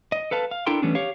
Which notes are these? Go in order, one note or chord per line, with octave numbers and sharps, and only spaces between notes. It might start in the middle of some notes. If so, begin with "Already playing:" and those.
D#5
A4 B4 F5 A5
F5
D4 E4 A4 A#4 G5 C6
E3 G3 A3 B3 C#4 D4
G4 C#5 F5